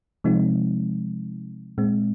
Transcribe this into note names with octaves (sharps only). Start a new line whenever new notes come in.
C3 F3 G#3 C4 D#4
A#2 G#3 C4